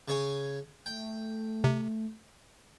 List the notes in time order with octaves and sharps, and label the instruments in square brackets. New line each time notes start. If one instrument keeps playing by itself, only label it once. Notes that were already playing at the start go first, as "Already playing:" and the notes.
[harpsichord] C#3 C#5 G#5
[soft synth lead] A3 [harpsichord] G5
[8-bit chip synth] C3